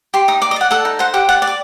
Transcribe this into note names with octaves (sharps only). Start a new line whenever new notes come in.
G4 C6
D#4 D#6
D5 D6
D#5
D5 F#5
A4 F#5
D#4
C5 F#5
G4 F#5
D5 F#5
D5
D6